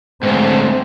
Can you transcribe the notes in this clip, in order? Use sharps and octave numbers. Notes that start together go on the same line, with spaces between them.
D2 G#2 C4